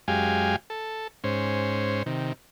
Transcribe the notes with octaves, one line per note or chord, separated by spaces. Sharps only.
F#2 G#3 G4 F5 G#5
A4
G#2 C#4 C5
C3 D#3